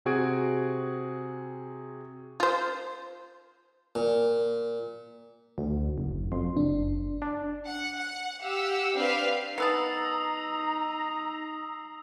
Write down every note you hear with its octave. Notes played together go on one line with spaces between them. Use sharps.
C3 C4 F#4 G#4 G#6 D7
F4 C5
A#2
D2 F#4
F#1
F2 C6
F#1 D4
D4
F#5
F#5
G4 F5 F#5 E6
C4 D4 G4 B4 F5
B3 D#4 B4 A5 A#5 D#6 E6 C7